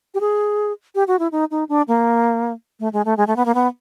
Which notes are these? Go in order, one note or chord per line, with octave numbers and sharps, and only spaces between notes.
G4
G#4
G4
F#4
E4
D#4
D#4
D4
A#3
A3
G#3
A3
G#3
A3
B3
A#3
B3